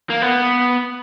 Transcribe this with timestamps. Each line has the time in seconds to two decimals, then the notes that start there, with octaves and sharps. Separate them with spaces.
0.10 A#3
0.22 B3